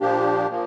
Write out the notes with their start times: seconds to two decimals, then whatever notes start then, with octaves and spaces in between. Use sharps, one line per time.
0.01 A#2 F3 A#3 D4 G4
0.50 A#2 F3 A#3